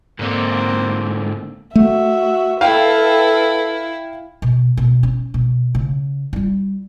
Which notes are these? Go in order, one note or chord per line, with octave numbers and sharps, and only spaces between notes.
G#2 D3 A#3 C4
A3 F#4 E5
E4 A4 B4 F5 G5
B2
B2
C#4
B2
C#3
G3 F4